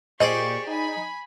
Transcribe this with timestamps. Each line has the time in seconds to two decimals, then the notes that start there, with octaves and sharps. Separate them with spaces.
0.20 A#2 G4 G#4 C5 D5 D#5 C#6
0.67 D#4 G#5 B5